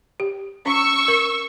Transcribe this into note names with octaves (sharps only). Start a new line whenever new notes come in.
G4
C#4 C#6 E6
A#4